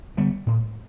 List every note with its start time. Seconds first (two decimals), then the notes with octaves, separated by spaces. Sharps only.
0.17 D3 G3 B3
0.47 A2